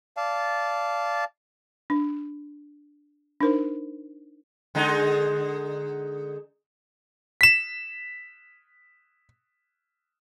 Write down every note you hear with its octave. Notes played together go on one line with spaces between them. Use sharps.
D5 F5 A5
D4
D4 D#4 A#4 C5
D3 G#3 D#4
B6 E7